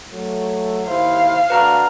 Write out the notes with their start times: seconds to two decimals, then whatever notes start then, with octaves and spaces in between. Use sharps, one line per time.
0.11 F#3 A3
0.86 D#2 E4 C5 F5
1.50 D2 D4 F#4 B4 A#5 F6